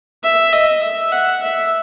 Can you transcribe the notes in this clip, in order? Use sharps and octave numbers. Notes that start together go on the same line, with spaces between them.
E5
D#5
E5
F#5
E5